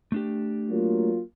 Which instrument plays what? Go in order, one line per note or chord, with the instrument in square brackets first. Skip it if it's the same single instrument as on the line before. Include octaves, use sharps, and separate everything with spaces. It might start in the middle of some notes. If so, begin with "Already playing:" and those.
[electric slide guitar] A3 D4 G4
[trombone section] F#3 A#3 F4